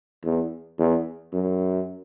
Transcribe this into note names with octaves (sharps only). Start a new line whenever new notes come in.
E2
E2
F#2